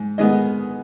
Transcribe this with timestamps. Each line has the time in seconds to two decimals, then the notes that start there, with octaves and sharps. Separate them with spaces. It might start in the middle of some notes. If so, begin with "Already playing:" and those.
Already playing: G#2
0.18 D#3 G#3 B3 D#5